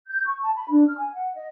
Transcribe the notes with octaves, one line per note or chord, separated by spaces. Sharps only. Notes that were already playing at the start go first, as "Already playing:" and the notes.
G6
C#6
A5
B5
D4
F6
G#5
F#5
D#5